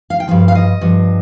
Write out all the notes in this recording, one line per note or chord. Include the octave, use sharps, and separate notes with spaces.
F5
G5
G2 F3 F5
F5
D#5
G2 F3